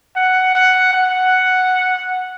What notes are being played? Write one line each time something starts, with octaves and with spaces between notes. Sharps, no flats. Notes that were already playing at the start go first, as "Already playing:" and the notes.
F#5
F#5
F#5